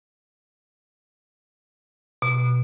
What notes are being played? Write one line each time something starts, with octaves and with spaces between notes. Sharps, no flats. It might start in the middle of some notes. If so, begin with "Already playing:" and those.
B2